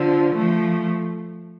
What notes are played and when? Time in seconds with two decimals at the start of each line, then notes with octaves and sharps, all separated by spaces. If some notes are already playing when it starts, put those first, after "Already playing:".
Already playing: D3 F3
0.35 F3 A3